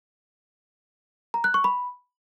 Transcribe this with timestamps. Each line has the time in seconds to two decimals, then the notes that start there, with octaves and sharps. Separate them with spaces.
1.34 A#5
1.44 F#6
1.54 C#6
1.64 B5